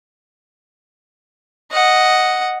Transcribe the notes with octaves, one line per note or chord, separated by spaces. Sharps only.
D#5 F#5